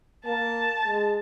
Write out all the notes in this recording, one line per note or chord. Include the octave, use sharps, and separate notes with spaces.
A#3 A5
G#3